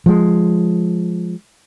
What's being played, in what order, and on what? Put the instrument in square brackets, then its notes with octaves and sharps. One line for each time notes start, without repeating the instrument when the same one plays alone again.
[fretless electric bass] F3 G#3